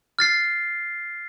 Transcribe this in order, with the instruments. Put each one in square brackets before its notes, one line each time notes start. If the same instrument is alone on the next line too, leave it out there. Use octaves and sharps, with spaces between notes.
[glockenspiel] F6 A6 C7